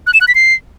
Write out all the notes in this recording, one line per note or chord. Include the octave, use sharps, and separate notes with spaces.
F#6
E7
F#6
B6
C7